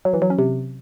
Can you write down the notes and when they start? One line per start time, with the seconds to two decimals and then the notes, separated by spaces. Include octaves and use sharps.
0.05 F#3
0.14 E3
0.22 F#3
0.30 C#4
0.39 C3